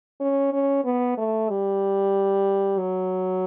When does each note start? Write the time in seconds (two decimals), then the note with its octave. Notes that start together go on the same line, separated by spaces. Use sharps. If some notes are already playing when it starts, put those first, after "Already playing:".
0.20 C#4
0.52 C#4
0.85 B3
1.17 A3
1.49 G3
2.79 F#3